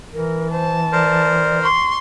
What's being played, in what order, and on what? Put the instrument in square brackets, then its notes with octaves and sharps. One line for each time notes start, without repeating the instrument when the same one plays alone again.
[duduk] E3 [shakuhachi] A#4
[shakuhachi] C5 [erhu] A5
[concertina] A#4 C5 [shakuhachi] D5
[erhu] C6 [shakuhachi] C#6